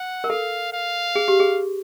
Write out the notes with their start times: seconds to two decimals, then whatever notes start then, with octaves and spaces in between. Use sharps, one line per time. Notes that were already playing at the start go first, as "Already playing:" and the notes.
Already playing: F#5
0.24 A#4
0.30 A4 F5
0.73 F5
1.16 G#4
1.28 G4
1.40 G#4